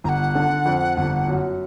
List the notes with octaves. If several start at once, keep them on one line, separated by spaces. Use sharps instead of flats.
G1 F#5 A#5
D3
F2
G1
F#2